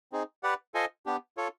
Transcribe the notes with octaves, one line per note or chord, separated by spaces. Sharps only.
C4 D#4 G#4
G4 B4 D5 F#5
F4 A4 C5 D#5 G#5
B3 D4 G4
F4 A4 C#5